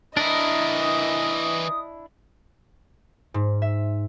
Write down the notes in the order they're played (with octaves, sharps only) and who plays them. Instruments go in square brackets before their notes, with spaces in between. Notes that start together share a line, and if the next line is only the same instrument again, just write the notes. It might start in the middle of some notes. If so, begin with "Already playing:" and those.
[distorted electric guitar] E3 A#4 [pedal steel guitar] D4 E4 [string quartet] D#5 [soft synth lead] D#6
[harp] G#2
E5